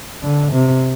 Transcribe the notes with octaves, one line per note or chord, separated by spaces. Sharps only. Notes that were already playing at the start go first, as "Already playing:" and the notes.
D3
C3